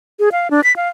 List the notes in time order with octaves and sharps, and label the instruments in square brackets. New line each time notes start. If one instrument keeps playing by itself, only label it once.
[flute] G#4
F5
D4
B6
F5